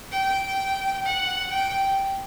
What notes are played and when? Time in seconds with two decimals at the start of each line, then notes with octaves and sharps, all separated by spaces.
0.12 G5
1.05 F#5
1.51 G5